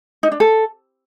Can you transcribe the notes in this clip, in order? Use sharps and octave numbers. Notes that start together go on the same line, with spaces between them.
D#4
D4
A4